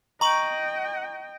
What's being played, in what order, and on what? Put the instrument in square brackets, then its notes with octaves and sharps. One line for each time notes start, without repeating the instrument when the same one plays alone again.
[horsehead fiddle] D#5 G5 [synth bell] A#5 C#6 F#7